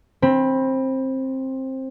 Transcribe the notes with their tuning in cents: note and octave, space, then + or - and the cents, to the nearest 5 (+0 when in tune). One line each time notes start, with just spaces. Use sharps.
C4 +15 B5 -10